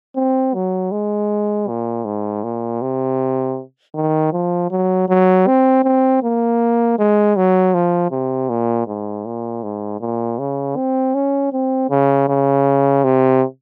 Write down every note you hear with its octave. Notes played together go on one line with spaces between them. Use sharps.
C4
F#3
G#3
A#2
G#2
A#2
C3
D#3
F3
F#3
F#3
C4
C4
A#3
G#3
F#3
F3
C3
A#2
G#2
A#2
G#2
A#2
C#3
C4
C#4
C4
C#3
C#3
C3